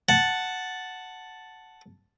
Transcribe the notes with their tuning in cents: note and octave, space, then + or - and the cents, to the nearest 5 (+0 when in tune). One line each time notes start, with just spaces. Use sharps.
F#5 +0 A5 +0